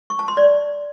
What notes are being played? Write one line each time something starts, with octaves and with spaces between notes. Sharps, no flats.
C#6
A5
C6
D5